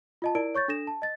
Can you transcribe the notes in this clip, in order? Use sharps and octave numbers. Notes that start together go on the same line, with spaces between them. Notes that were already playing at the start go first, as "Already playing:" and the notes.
F4 D#5 A5
E4 A#4 D5 D7
C#5 C#6 G6 A6
D4 A4 A#6 E7
A5
D#5 A6